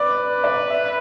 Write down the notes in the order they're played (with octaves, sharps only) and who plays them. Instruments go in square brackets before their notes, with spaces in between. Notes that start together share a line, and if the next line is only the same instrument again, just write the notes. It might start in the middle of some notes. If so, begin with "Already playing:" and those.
Already playing: [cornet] B4 [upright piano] D5
[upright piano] D5
E5